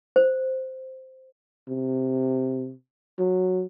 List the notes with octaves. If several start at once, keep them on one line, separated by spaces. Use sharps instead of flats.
C5
C3
F#3